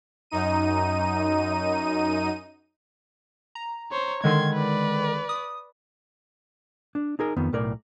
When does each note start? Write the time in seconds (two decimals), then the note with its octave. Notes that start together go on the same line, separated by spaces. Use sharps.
0.30 F#2 D#4 D#7
3.55 A#5
3.92 C5 C#5
4.24 D3 D#3 G#3 C6 G#6
4.54 B4 D5
5.29 D#6
6.95 D4
7.19 D#4 G#4 A#4
7.36 F2 D#3 B3
7.53 B1 A2 A#4 D5